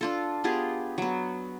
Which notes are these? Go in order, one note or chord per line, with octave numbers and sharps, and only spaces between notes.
D4 F4 A4
B3 F4 G4 G#4
F#3 B3